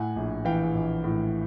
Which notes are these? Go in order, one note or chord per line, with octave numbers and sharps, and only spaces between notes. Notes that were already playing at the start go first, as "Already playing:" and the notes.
Already playing: A2 F#5 G#5
A#1
E3 F5 G5
A#1
A2